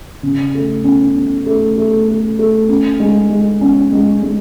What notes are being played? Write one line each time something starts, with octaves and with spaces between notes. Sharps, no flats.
C#3
A3
C#4
C#4
A3
A3
A3
A3
C#4
G#3
G#3
C#4
G#3
G#3